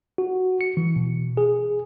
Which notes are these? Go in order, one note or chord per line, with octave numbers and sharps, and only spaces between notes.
F#4
C#7
E3
B2
G#4